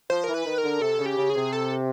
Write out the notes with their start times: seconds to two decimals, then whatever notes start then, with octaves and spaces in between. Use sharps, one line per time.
0.10 F3 C5
0.24 E3 A#4
0.34 B4
0.46 D#3
0.58 A#4
0.64 D3
0.81 C3 A4
1.00 C#3
1.06 G4
1.17 C#3
1.30 G#4
1.36 C3
1.53 A4